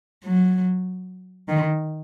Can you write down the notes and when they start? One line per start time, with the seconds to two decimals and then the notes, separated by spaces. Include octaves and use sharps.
0.24 F#3
1.48 D#3